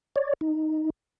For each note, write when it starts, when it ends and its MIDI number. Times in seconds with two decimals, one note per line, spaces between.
0.16 0.33 73
0.16 0.33 74
0.41 0.90 63